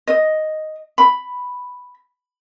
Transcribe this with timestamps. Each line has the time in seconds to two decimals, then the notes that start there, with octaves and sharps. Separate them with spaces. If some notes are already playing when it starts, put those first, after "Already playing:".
0.07 D#5
0.98 B5